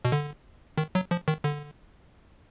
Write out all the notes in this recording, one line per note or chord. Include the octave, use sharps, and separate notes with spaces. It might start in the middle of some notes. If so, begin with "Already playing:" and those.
B2
D3
D#3
F#3
F3
D#3
D3